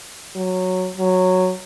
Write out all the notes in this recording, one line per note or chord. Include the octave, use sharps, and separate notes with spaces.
F#3
F#3